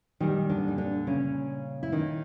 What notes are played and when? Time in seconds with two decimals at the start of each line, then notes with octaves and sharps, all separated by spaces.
0.20 A#2 D#3 G3 D#4
0.49 D3 D4
0.68 D#4
0.78 D3 D4
1.07 C#3 C#4
1.83 E4
1.92 D#3 D#4